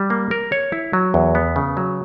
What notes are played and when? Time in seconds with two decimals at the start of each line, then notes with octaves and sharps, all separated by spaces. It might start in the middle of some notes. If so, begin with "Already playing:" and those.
Already playing: G3
0.10 A#3
0.31 A#4
0.52 C#5
0.72 E4
0.93 F#3
1.14 E2
1.35 B3
1.56 C#3
1.77 F#3